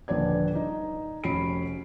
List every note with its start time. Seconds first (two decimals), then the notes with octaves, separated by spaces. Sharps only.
0.08 D#1 A#1 D3 B4 D5 G#6
0.55 D#4
1.24 F1 C#4 F#4 B5 C7 D7